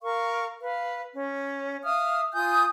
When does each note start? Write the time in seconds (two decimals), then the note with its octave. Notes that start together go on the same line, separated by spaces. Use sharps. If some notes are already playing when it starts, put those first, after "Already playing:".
0.03 A#4 F5 C#6
0.61 B4 F5
1.14 C#4
1.83 E5 F5 D#6 F6
2.33 F4 G#5 D#6 G6